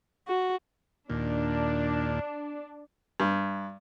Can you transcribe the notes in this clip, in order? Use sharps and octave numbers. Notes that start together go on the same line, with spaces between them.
F#4
D#2 A#2 D4
G2